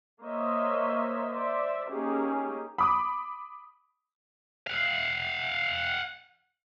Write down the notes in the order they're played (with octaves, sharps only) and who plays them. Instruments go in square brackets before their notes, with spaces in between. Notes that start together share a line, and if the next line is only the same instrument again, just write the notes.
[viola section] A#3 C5 C#5 D#5 E5
C5 D5 E5
A#3 C#4 D#4 G4 G#4
[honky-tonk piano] B5 D6 D#6
[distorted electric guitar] F5 F#5